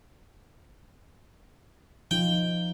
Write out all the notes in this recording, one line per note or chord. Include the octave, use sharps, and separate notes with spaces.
F3 D#4 F4 G5